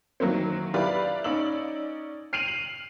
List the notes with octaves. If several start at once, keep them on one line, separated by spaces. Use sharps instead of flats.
D#3 E3 F#3 A#3 C4
E4 G4 B4 D5 F5 B5
C#4 D#4 D5 E6 F#7
F6 C7 D7 D#7 F7 F#7
F#7